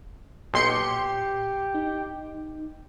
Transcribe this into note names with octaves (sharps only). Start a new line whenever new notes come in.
B1 A#2 G4 C6 C#7
D#4